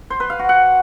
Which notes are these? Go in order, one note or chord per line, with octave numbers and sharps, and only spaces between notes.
C5
B4
F5
F#4
F#5